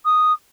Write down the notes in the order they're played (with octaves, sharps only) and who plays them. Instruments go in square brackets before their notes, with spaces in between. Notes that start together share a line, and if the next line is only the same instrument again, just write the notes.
[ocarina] D#6